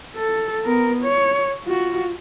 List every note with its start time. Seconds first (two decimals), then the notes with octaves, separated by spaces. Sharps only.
0.16 A4
0.65 B3 A#4
1.03 C#5
1.65 F4 F#4